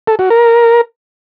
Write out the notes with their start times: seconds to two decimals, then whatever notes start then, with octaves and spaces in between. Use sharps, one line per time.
0.07 A4
0.19 F#4
0.30 A#4